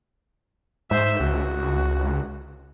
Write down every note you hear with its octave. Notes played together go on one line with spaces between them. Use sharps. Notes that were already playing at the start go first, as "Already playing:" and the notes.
G#2 C5 E5
C#2 F#4